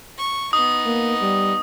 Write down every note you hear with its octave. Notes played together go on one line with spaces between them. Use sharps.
C#6
B3 D#4 D#6
A#3
G3